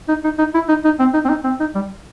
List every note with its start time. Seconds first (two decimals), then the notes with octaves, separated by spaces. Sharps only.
0.08 D#4
0.24 D#4
0.38 D#4
0.54 E4
0.69 D#4
0.85 D#4
0.99 C4
1.14 D#4
1.25 C4
1.29 D#4
1.44 C4
1.60 D#4
1.75 G3